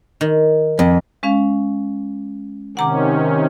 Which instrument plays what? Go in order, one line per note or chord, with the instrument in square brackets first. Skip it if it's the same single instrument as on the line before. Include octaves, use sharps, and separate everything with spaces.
[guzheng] D#3
[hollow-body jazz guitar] F2
[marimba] G#3 C#4 F5
[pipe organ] C3 D#3 C#4 [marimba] F#5 A#5 D6